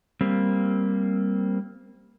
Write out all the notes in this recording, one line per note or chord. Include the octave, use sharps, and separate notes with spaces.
G3 A#3 C4